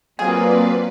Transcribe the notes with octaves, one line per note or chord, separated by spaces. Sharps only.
F#3 A#3 C4 F4 G#4 B4 D5